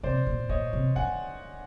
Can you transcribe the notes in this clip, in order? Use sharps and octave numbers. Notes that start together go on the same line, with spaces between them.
C3 C5 D5
A#2
A#2 C#5 D#5
C3
D3 F#5 G#5